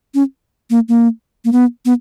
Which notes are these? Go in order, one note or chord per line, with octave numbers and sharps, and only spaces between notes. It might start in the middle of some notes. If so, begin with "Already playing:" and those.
C#4
A#3
A#3
A#3
B3
B3